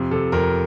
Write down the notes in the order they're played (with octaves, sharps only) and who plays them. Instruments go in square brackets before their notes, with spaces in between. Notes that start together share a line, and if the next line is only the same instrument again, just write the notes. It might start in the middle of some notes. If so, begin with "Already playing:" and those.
Already playing: [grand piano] F2 C3
C3 A4
F2 A#4